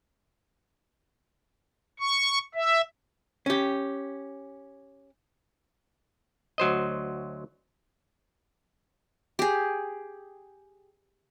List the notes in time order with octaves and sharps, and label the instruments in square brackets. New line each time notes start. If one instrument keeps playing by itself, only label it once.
[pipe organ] C#6
E5
[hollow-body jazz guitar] C#4 G4
[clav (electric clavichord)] D2 F#3 C5 D#5
[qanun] G4 G#4